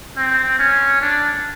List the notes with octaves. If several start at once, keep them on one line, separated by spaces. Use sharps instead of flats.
C4
C#4
D4